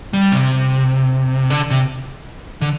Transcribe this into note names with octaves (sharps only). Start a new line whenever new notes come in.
G3
C3
D3
C3
D3